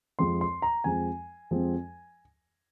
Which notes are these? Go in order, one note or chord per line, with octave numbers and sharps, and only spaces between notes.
F2 F3 G#3 C4 C6
C6
A#5
F2 F3 G#3 C4 G#5
F2 F3 G#3 C4